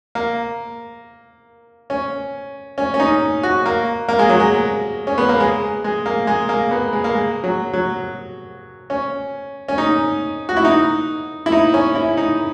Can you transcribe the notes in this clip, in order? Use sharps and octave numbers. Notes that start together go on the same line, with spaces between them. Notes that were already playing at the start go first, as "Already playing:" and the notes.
A#3
C#4
C#4
C#4
D#4
F#4
A#3
A#3
G#3
F#3
G#3
C#4
B3
A#3
G#3
G#3
A#3
G#3
A#3
B3
G#3
A#3
G#3
F#3
F#3
C#4
C#4
D#4
F#4
E4
D#4
E4
D#4
C#4
E4
D#4